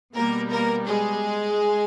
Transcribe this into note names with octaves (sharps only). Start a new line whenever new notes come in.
B2 G3 A#3 B3 A#4
A#3 A#4
G#3 G#4